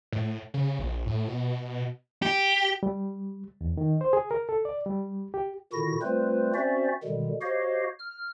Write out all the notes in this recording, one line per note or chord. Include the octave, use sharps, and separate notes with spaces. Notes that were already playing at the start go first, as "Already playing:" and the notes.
A2
C#3
A#1
A2
B2
G4
G3
E2
D#3
C5
G#4
A#4
A4
D5
G3
G4
A#2 D3 D#3 E4 F#4 A#6
G3 A3 C4 F4 B4 C5
C4 C#4 F#4 C5 D5 E5
B2 D3 D#3 G3 G#3
F#4 G4 C5 C#5 D#5 F5
F6